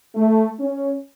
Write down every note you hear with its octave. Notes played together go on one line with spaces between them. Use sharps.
A3
C#4